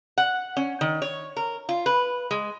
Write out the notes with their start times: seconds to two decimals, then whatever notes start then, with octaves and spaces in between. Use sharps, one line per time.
0.18 F#5
0.57 C#4
0.81 D#3
1.02 C#5
1.36 A#4
1.69 F4
1.86 B4
2.31 G#3